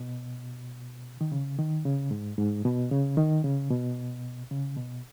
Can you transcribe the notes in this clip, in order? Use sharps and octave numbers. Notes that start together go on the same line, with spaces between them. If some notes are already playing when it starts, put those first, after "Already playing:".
Already playing: B2
D#3
C#3
D#3
C#3
G#2
G#2
B2
C#3
D#3
C#3
B2
C#3
B2